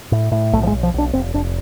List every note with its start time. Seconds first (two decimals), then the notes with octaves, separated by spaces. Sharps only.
0.12 A2
0.32 A2
0.53 B1 A3
0.63 F3
0.67 G#3
0.72 B1
0.83 F3
0.94 B1 D4
1.13 F1 C4
1.34 F1 D4